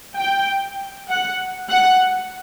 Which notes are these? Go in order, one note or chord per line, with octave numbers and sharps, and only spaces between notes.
G5
F#5
F#5